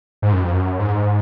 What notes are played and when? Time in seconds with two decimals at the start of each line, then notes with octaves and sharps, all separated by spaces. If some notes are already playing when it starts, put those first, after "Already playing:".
0.22 G#2
0.33 F#2
0.43 F2
0.53 F#2
0.79 G#2